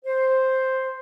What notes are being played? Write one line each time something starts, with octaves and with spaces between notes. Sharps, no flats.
C5